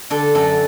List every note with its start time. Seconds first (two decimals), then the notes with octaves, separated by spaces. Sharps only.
0.10 D3 A4
0.35 F#2 A4